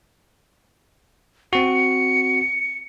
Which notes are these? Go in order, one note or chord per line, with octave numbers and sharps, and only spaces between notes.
C4 F#4 C#7